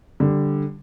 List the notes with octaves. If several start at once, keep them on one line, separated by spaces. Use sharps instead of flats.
D3 G3